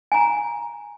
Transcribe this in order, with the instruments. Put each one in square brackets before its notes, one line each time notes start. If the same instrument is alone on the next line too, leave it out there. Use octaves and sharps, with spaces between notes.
[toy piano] G#5 A#5